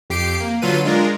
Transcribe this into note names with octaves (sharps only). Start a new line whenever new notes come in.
F2 G4 C7 D7
A#3
D3 F#3 F4 A4 B4 D#7
G#3 D4 F4 A#4